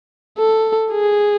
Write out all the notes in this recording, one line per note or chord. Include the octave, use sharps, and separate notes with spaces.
A4
G#4